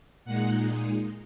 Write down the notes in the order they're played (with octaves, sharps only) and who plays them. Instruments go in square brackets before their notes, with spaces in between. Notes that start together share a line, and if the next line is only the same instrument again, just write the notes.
[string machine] A#2 G#3 D#4 F#5